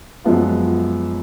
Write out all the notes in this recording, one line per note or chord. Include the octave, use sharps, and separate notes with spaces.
F#2 F3 G#3 B3 F4